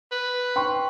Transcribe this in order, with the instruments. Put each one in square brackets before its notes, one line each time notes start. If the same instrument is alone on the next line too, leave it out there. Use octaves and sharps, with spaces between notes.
[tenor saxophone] B4
[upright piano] G5 C6 C#6